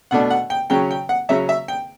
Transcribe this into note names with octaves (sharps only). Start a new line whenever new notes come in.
B2 A3 D4 F#5
F#5
G5
C#3 F#3 C#4 G5
G5
F#5
C#3 F#3 C#4 E5
E5
G5